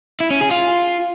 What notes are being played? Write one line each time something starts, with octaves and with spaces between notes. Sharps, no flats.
E4
C#4
G#4
F4